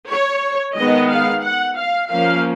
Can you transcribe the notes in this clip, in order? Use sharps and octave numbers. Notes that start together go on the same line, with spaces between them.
C#5
D#3 G#3 B3 D#5
F5
F#5
F5
F3 A#3 C#4 F5